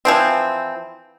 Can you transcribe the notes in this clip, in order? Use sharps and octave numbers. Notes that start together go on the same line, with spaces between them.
E3 F3 C4